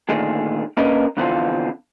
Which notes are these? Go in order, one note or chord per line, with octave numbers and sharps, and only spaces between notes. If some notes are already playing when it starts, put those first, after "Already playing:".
A#2 D3 D#3 A3 G#4
A#3 C#4 D4 A#4 B4 D#5
F2 B2 D3 E3 C4 F4